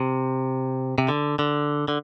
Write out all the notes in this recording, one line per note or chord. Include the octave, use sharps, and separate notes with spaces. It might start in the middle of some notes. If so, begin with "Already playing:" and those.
Already playing: C3
C3
D3
D3
D3